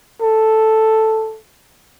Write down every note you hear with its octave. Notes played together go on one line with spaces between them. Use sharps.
A4